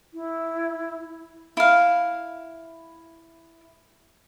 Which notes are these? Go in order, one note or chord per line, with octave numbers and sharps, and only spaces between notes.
E4
E4 F5